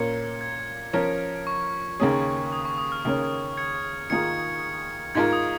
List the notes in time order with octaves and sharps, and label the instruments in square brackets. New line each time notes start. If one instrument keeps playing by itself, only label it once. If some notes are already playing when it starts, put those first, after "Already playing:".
Already playing: [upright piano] A#2 A#3 C#4 [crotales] G#6 C#7
[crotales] G#6
[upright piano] F3 C#4 A#4
[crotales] C#6
[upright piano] D#2 C#3 A#3 C#4 G#4
[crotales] D#6
C#6
D#6
F6
[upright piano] D#2 C#3 A#3 C#4 [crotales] F6
[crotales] G#6 C#7
[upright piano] G#2 D#3 A#3 F4 G#4 [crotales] G#6 C#7
[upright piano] G#2 G#3 F4 A#4 [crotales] G#6
[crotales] D#6